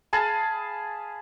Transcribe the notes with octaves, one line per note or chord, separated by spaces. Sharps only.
G#4 F5 A5 B5